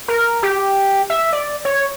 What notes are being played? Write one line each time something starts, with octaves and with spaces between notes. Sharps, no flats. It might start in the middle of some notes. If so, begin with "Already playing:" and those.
A#4
G4
E5
D5
C#5